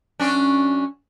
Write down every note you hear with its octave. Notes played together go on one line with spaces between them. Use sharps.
F#2 C#4 D4